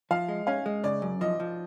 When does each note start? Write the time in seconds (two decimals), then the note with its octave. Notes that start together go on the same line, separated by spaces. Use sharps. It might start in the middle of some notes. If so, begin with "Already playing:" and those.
0.11 F3 F5
0.29 G#3
0.47 C#4 F5
0.66 G#3
0.83 C#3 D5
1.02 F#2
1.21 F3 D#5
1.40 F3